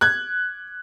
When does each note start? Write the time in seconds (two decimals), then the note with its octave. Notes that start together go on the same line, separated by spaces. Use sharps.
0.01 F#6 G#6